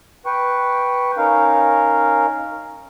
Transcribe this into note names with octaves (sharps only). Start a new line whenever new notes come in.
B4 G5 C#6
C#4 D#4 A#4 F5